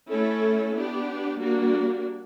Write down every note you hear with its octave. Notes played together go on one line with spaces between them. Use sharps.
A3 C#4 E4 A4
B3 D4 G4
G3 A#3 D4 F#4